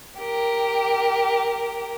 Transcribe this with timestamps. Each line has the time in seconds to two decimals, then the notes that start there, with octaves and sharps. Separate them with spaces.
0.19 G4 A#4